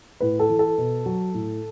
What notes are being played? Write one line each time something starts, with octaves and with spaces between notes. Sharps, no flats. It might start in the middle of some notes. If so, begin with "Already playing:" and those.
A2 B4
A4
E3
A4
B2
F#3
A2